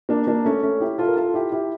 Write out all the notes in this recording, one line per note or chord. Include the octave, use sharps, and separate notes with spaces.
A#3 D4
A#3 D4
A3 C#4
A3 C#4
E4 G4
F4 A4
A#4
F4 A4
E4 G4
E4 G4